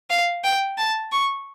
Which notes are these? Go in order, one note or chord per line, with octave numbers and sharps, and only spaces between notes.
F5
G5
A5
C#6